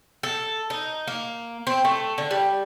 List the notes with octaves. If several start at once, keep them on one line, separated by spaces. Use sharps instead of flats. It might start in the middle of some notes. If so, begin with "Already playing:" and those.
A4
D#4
A#3
C4
A3
D3
G3